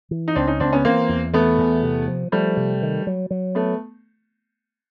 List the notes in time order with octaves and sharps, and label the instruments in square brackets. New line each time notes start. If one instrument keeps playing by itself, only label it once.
[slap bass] E3
[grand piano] D#4
[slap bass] C#2 [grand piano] C4 D4
[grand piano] C#4 D#4
[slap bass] C#2 [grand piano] C4 D4
[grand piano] B3 C#4
[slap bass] E3 [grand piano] A#3 C4
[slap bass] E2
[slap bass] E3 [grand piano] A3 B3
[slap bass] E2
C3
F3
[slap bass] F3 [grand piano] G3 A3
[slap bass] C3
D#3
F#3
F#3
[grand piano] A3 B3